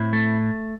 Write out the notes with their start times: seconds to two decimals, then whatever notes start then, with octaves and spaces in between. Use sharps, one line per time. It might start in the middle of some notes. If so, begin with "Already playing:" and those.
Already playing: A2 C4 E4
0.13 A3